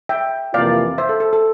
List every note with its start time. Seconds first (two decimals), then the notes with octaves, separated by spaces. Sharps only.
0.09 E5 G5
0.54 F2 C3 E3 A#3 F4 D5 F5
0.98 C5 E5
1.09 A4
1.20 A4
1.33 A4